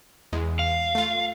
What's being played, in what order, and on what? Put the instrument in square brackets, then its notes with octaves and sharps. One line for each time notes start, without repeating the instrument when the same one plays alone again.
[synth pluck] E2 G#3
[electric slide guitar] F5
[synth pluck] A3 F4